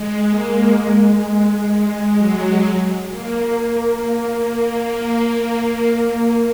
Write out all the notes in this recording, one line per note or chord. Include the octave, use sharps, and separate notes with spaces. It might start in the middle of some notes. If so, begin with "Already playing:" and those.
Already playing: G#3
A#3
G#3
G#3
F#3
A#3